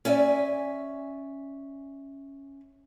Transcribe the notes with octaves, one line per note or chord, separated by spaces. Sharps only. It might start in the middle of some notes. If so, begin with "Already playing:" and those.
C#4 D5 E5 G#5